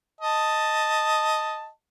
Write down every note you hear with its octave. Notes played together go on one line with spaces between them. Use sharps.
D#5 A5